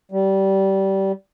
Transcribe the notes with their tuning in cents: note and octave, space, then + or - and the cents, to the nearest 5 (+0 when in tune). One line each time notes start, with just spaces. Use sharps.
G3 -20